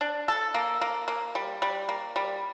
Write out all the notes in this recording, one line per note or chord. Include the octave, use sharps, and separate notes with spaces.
D4
A4
A#3
A#3
A#3
G3
G3
A#3
G3